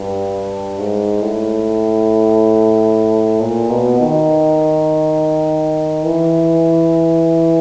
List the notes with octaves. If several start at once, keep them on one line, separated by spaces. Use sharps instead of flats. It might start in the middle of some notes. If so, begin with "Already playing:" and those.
Already playing: G2
G#2
A2
A#2
B2
D#3
E3